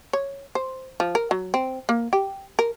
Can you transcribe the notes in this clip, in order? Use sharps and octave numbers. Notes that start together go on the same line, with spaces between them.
C#5
C5
F3
A#4
F#3
C4
A#3
G4
A#4